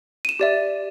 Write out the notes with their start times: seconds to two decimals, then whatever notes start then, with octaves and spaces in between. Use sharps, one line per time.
0.25 D#7 E7
0.40 G4 D5 E5